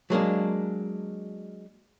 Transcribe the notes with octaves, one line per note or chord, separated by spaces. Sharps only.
F#3 G#3 A#3 D4